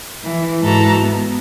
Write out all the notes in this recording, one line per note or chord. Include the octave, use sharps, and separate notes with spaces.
E3
G#2 E3 F#4 A4 A#5
B3